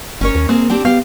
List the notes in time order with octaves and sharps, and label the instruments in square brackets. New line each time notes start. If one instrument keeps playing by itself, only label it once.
[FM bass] G1 [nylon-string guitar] C#4 A#4 C#5
[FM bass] D#2
[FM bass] A#3 [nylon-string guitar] C4 G#4 A#4
[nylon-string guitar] C4 D4 G4
[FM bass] B3 [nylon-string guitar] G4 F5